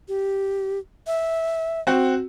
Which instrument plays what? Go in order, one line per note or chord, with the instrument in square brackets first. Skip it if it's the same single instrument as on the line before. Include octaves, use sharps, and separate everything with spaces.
[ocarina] G4
E5
[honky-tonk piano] C4 F#4